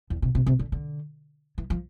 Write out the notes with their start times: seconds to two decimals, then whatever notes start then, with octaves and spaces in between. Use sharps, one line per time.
0.10 E2
0.22 C3
0.35 C3
0.46 C3
0.59 D3
0.72 D3
1.58 E3
1.70 F3